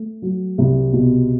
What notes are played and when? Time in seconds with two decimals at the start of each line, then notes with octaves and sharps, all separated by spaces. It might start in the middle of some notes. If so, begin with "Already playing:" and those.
Already playing: A3
0.22 F#3
0.58 C2
0.93 B2